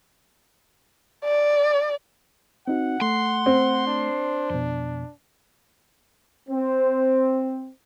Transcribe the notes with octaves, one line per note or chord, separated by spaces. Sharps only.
D5
C4 D#4 F#4 F#5
A3 C6
C4
D4
F2 B2
C4